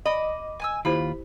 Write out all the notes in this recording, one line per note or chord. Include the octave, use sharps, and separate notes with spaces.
D#5 B5 D6
G#5 D#6 E6
D#2 E4 F4 G4 C5 B5